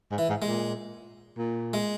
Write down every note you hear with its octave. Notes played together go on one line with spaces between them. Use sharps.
G#2
E3
G#2
G#3
A#2
A#2
G#3